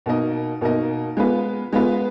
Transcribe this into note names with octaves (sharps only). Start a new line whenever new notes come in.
B2 A#3 D#4 A#4 D#5
B2 A#3 D#4 A#4 D#5
G#3 B3 F4 B4
G#3 B3 F4 B4